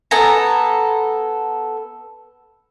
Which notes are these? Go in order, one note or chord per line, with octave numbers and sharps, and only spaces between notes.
B3 A4 G#5 A#5